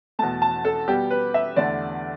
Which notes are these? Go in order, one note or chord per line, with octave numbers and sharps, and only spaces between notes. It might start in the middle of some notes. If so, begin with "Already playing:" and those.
E2 B2 A3 A5
A5
A4
B2 G3 B3 G4
B4
E5
E2 D3 A3 D5